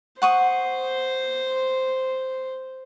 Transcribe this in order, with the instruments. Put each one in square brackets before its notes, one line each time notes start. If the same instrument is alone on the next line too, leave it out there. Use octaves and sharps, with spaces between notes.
[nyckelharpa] C5 [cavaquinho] F#5 C#6 D#6